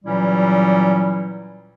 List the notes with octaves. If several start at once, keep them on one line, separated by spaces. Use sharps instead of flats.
A#2 E3 F#3 G3 C#4 E4